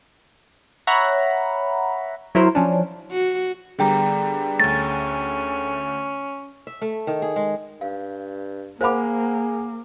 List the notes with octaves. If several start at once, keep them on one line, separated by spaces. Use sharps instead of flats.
C#5 E5 F#5 A#5 B5
F#3 E4 A#4 C5
F3 C#4 D4
F#4
D3 G3 B3 G#4 G5 A#5
D2 A3 C#4 A6
E5
A3
D#3
G#4
G#3
G2 F5
A#3 G#4 A#4 C5 F5 F#5 B5 D6